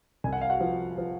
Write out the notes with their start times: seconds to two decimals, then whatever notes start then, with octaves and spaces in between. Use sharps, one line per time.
0.24 C2 G#5
0.33 F#5
0.41 F5
0.50 F#4 F#5
0.60 F3
0.98 F3